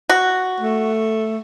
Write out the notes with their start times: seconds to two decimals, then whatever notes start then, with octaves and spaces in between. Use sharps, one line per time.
0.09 F#4
0.60 A3